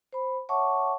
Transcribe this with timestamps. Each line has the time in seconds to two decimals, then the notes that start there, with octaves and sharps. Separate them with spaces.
0.13 C5 B5
0.49 C#5 E5 F#5 A5 C#6 D6